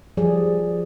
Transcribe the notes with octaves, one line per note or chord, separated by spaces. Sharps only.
F3 G3 G#4 D5